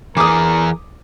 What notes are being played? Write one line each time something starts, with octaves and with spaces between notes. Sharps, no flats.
E3 G#4 A#4 D6 D#6